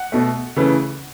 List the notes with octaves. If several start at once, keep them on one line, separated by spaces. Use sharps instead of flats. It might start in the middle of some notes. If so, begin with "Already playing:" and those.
Already playing: F#5
B2 A3
C#3 E3 A3